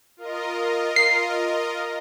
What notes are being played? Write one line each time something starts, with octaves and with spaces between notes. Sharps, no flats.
F4 A#4 D#5
C7